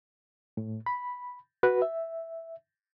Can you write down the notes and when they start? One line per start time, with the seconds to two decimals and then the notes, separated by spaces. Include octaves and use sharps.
0.57 A2
0.86 B5
1.63 F#4 B4
1.82 E5